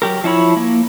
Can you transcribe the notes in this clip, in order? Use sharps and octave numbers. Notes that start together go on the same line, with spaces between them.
F#3 G4 A#4
F3 E4 C#5 B5
A#3